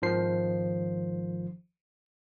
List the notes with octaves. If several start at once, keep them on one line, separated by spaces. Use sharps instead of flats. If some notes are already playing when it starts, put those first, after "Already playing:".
G#1 D#3 F3 C5 C7